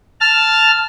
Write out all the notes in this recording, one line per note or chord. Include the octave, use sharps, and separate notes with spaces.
A5 F6